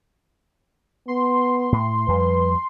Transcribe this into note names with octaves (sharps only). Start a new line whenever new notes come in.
B3 C6
A2
F2 F3 G3 B4